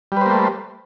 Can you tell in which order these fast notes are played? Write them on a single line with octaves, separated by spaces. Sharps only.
G3 B4 C5 A#3 A3